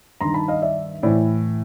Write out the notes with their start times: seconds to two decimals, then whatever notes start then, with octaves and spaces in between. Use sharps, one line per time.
0.21 G2 D#3 A#5 C6
0.34 A5 B5
0.48 D#5 F5
0.62 D5 E5
1.03 A2 E3 C5 D5